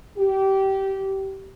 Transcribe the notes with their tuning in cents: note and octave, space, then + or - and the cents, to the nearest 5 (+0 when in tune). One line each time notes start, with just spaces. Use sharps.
G4 -20